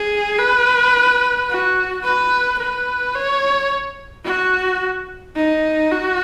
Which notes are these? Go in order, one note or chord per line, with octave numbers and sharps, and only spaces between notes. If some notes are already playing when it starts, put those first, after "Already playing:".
Already playing: G#4
B4
F#4
B4
B4
C#5
F#4
D#4
F#4